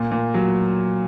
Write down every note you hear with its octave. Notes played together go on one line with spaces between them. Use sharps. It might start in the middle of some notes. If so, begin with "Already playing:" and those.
Already playing: A#2
A#2
F#3